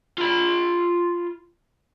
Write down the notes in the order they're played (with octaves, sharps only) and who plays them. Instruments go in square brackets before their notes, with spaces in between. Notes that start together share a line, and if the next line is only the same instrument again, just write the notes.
[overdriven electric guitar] F4 B5